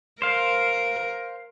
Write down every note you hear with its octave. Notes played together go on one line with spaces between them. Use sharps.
A#4 C5 F5